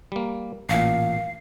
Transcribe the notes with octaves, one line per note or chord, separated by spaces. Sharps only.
G3 A#3
A1 A#2 F5